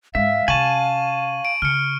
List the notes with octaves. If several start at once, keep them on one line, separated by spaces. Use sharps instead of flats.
G#2 G#3 E5 F5
C3 C#4 G#5 A5 C#6 D#7 F#7
D7
C#3 F6 C#7